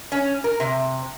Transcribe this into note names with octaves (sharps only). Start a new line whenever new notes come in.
C#4
A#4
C3